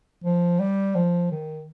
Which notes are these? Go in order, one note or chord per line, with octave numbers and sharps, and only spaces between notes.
F3
G3
F3
D#3